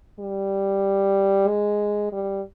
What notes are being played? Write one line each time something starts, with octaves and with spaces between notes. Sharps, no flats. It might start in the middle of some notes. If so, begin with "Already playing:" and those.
G3
G#3
G3